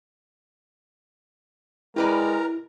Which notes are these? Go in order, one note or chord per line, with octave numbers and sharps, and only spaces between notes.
G#3 E4 G4 A#4 B4 D5 A#5